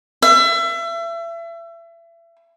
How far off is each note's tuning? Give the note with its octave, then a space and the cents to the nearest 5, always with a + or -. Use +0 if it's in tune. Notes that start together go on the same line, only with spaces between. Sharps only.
E5 +30